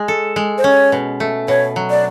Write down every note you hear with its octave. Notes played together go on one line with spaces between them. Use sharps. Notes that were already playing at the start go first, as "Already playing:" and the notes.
Already playing: G#3
A4
G#3
C5
C#4 C#5
B2
A3
B2 C#5
F#3
D5